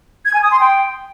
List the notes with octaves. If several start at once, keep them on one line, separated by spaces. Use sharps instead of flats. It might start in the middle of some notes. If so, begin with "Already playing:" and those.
G#6
G#5
D#6
C6
G5